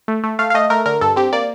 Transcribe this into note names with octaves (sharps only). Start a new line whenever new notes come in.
A3
A3
A3 F5
F5
A3 D#5
A3 A#4
D3 A#4
G2 A4
C4 G4
A#3 D5